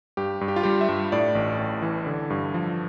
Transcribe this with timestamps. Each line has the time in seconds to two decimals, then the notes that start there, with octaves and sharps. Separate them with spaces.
0.17 G2 G4
0.41 G2
0.48 G4
0.56 F4
0.63 G3 G4
0.81 E5
0.89 G2
1.12 A2 D5
1.35 A1
1.59 A2
1.82 E3
2.07 D3
2.30 G2
2.54 F3